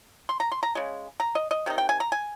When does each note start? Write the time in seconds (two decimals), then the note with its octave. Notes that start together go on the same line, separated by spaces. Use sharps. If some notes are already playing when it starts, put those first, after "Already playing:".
0.29 C6
0.40 A#5
0.52 C6
0.63 A#5
0.75 C#3 G#3
1.20 A#5
1.35 D#5
1.51 D#5
1.66 C3 D#3 D#4
1.78 G5
1.89 G#5
2.00 A#5
2.12 G#5